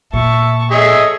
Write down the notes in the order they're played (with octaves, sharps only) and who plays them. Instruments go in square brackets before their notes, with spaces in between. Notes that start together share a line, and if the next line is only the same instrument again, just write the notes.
[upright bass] A#2 [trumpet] E5 [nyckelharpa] A5 C#6
[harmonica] G#4 E5 [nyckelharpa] A4 C#5 [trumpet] D#5